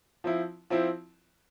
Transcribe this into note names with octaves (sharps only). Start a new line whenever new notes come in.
F3 C4 E4
F3 C4 E4